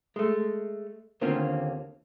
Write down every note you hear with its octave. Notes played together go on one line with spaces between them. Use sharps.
G#3 A3
D#2 D3 A#3 C4 C#4 F4